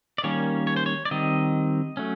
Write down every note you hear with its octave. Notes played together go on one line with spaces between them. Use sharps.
D5
D#3 G3 A#3 C#4 C#5
C#5
C5
C#5
D5
D#3 G3 C4 D#5
F#3 A3 C#4